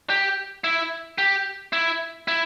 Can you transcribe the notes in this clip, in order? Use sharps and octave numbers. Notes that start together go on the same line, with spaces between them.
G4
E4
G4
E4
E4